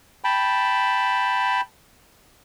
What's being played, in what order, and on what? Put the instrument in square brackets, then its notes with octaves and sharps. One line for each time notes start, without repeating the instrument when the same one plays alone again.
[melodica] G5 A5 B5